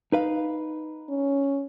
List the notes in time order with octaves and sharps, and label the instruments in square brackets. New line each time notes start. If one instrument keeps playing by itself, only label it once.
[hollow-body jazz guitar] D#4 B4 F5
[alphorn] C#4